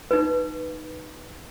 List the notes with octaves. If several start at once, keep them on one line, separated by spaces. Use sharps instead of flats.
D#4 B4